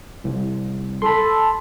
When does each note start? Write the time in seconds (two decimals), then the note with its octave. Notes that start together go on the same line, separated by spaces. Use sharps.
0.24 C2
1.02 A4 B5 C6